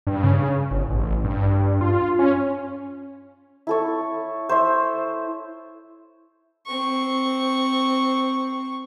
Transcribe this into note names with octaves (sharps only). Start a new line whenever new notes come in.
G2
C#3
G1
A1
G2
F4
C#4
E4 A4 C#5
C5 C#5 E5
C4 C#6